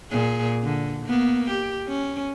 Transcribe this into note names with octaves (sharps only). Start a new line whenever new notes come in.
A#2 G#4
D3
A#3 B3
G4
C#4